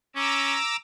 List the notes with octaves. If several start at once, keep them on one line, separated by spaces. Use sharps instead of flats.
C#4 A#5 D6 E6